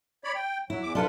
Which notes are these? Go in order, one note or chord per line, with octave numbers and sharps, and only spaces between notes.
C#5 D5 B5
G5
F#3 E4
E2 D6
D4 F4 A4 B4